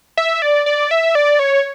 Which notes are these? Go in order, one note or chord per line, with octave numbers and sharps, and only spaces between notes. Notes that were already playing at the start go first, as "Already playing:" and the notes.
E5
D5
D5
E5
D5
C#5